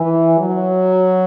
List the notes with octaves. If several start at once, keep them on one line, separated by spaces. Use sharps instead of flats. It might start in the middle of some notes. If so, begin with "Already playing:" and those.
Already playing: E3
F#3